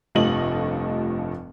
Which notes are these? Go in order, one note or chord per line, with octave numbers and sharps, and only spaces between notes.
F1 G2 F3 A3 D#5 F#7